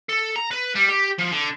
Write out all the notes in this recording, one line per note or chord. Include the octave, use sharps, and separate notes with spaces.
A4
A#5
B4
G3
G4
F3
D3